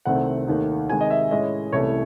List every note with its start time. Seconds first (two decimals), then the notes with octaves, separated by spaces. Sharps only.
0.05 C2 C3 D#3 A3 C4 F#5
0.47 D#2 D#3 A3 D#4
0.90 C3 D#3 G#3 D#4 G#5
1.01 D#5
1.10 E5
1.31 A2 G#3 C#4 E4 D#5
1.73 C2 C3 E3 A3 C#4 C#5